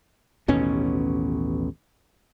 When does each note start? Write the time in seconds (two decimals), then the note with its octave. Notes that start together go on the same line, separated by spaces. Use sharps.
0.48 A1 D#2 B2 C#4